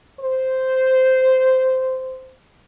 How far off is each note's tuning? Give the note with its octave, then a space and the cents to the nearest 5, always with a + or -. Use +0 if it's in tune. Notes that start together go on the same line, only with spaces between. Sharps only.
C5 -10